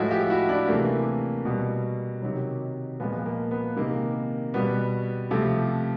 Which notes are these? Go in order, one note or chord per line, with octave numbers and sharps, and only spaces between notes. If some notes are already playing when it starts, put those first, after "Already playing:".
Already playing: A2 F3 G#3 E4 F#4
F4 G4
E4 F#4
D4 E4
C3 E3 A3 A#3
B2 G3
C3 D#3 F#3
A#2 F3 G#3 B3
A#3
B3
C3 D#3 G#3 A#3
B2 G3 B3
C3 F3 A3